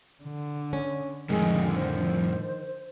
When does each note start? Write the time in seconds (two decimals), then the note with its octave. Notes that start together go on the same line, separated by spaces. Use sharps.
0.23 D3
0.73 C#4
1.29 F2 A2 D3 D#3 F3 G#3
1.76 C5